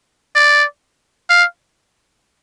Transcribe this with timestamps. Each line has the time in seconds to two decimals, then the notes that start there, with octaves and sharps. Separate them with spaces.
0.35 D5
1.30 F5